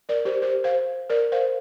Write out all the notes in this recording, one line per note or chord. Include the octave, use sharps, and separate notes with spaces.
A#4 D5
G4 C5
G4 C5
C5 F5
A#4 D5
C5 F5